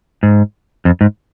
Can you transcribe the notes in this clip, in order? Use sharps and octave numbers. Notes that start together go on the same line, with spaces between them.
G#2
F2
G#2